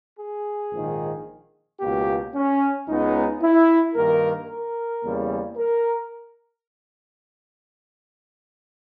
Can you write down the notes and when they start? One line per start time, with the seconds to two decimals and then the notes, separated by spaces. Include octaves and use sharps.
0.20 G#4
0.72 A#1 G#2 D#3
1.80 C#2 B2 A#3 G4
2.34 C#4
2.88 C#2 C#3 G#3 B3 D#4
3.42 E4
3.95 G2 D#3 A#3 A#4
4.49 A#4
5.03 E2 C#3 G3 A#3
5.57 A#4